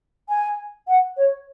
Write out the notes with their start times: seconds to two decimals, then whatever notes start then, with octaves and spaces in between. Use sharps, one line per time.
0.29 G#5
0.87 F#5
1.17 C#5